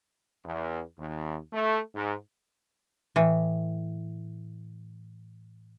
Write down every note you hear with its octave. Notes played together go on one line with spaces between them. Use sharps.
E2
D#2
A3
G#2
A2 E3